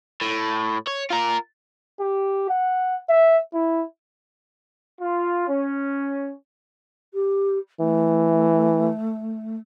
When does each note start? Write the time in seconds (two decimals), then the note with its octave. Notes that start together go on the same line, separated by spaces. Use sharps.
0.21 A2
0.87 C#5
1.11 F4 A#4
2.00 G4
2.49 F#5
3.09 E5
3.54 E4
5.01 F4
5.48 C#4
7.13 G4
7.80 E3 A3